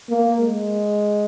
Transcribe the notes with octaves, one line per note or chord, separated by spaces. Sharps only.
A#3
G#3